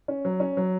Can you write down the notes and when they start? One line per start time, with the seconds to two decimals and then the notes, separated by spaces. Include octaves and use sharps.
0.08 C#4
0.25 F#3
0.40 C#4
0.57 F#3